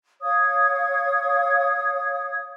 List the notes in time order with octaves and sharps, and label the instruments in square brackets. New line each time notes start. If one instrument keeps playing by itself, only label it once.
[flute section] C#5 F5 D#6 G#6